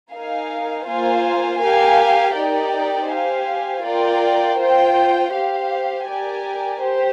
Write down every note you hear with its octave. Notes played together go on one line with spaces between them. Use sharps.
D#4 A#4 F5 G#5
A#3 F4 C5 F5 G#5
G4 A#4 F5 G#5
D#4 G4 A#4 D5 G5
G4 C5 F5 G#5
F4 A#4 D5 G5
F4 C5 G5
G4 C5 F5
G4 A#4 D5 G#5
G4 C5